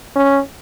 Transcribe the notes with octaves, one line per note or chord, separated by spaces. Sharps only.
C#4